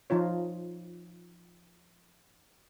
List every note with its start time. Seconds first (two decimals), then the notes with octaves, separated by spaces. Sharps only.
0.10 F3 D#4 F4 C#5